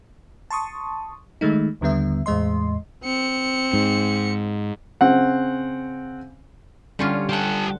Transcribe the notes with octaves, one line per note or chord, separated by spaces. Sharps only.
A5 C6 C#6 D#6
D#3 G#3 A3 D#4
D#2 D3 G3 B3 E5
E2 A2 G#3 D#5 C6
C4 C#7
G#2
C#3 C4 F#5
D3 G3 C#4 F4
G4 A4 C5 F#5